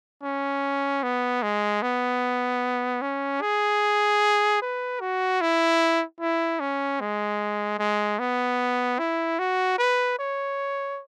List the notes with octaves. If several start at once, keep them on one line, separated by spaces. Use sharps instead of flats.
C#4
B3
G#3
B3
C#4
G#4
B4
F#4
E4
E4
C#4
G#3
G#3
B3
E4
F#4
B4
C#5